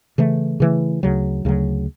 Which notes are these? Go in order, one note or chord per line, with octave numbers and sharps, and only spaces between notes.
C#3 E3 A3
C#3 E3 A3
D2 C#3 F#3
D2 C#3 F#3